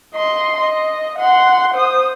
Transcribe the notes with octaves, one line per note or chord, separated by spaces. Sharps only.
D#5 C6
D#5
F#5 C6
C5 D#6